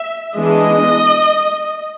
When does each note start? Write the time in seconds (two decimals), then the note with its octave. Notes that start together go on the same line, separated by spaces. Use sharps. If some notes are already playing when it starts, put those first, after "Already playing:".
Already playing: E5
0.34 E3 G#3 B3 D4 D#5